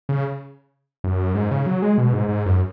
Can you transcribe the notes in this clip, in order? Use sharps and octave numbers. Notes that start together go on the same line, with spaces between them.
C#3
F#2
G#2
C#3
F#3
G#3
B2
G#2
G#2
F#2